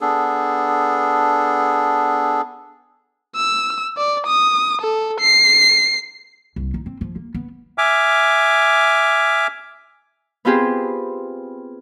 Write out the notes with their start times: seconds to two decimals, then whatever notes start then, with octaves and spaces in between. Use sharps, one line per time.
0.01 B3 D4 G#4 A4
3.36 E6
3.97 D5
4.27 D#6
4.82 A4
5.20 C7
6.56 C2
6.74 D#4
6.86 C4
7.01 F3
7.16 A#3
7.34 B3
7.78 E5 G#5 D6 F6
10.45 B3 C4 F4 G4 G#4 C5